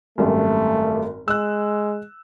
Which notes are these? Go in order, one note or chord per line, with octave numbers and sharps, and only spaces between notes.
G#1 F#2 G3 A3
G#3 E6 F#6